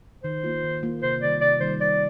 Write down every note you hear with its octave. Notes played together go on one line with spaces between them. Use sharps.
D#3 C5
A#3 F4
D#3
A#3 F4
C3 C5
D#3 G3 D5
C3 D5
D#3 G3 C5
G3 D5